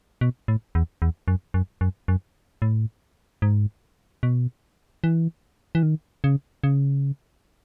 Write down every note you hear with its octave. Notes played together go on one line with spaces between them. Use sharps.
B2
A2
E2
E2
F#2
F#2
F#2
F#2
A2
G#2
B2
E3
E3
D#3
C#3
C#3